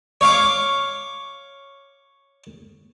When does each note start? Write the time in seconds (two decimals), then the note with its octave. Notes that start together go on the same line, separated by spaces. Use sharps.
0.21 C#5 F5 D6